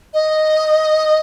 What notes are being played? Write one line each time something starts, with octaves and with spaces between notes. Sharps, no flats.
D#5